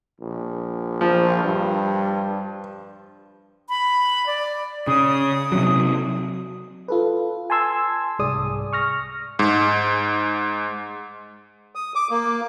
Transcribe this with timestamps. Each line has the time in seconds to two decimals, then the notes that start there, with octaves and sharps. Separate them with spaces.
0.20 A#1
1.01 F3
1.44 G2
3.69 B5
4.26 D5
4.87 C#3 D#6
5.52 C3 F#3
6.88 F4 A4 B4
7.50 G#5 A5 C6 E6 G#6
8.19 C2 G#2 G#4 D5 D#6
8.73 C#6 F6 A#6
9.39 G#2
11.75 D#6
11.95 D6
12.11 A#3